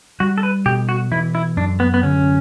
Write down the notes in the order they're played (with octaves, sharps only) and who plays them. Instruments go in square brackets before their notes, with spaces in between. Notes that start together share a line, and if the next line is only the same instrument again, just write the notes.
[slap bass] G3 [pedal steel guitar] F#4
[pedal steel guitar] A4
B4
[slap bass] B2 [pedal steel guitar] G4
[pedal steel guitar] F#4
[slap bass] E3 [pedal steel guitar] E4
[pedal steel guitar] E4
[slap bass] F#2 [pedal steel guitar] D4
[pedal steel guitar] B3
B3
[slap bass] D3 [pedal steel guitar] C#4